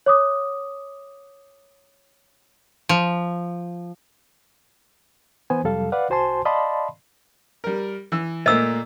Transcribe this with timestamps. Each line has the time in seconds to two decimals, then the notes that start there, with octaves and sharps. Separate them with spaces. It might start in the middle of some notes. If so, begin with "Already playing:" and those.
0.06 C#5 D6 D#6
2.89 F3
5.50 E3 B3 C5 G#5
5.64 F2 C3 F#3 G3 A4 F5
5.92 B4 D5 F5 F#5
6.09 C2 F#4 C5 G#5 A5 C6
6.45 D5 D#5 F5 A5 B5 C6
7.64 G3 A#4
8.12 E3 E6
8.46 A#2 A3 A#3 D#5 E6